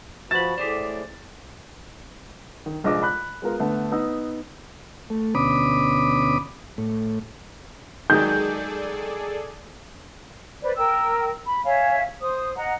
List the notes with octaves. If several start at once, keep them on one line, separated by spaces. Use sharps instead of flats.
F3 F#4 B4 A5 B5 A6
A2 G4 G#4 C5 D5
D#3
F1 A#1 G#3 D#5 D6
B5 F#6
G#3 B3 F4 A#4
D3 A3 B3
B3 D#4 E6
A3
D2 B2 C#4 B5 D6 D#6
A2
D#3 F#3 G#3 G#4 A4 D5 G6
B4 C5 D5
A#4 G5 E6
B5
C#5 E5 F5 G#5
C5 D#6
D#5 F#5 A#5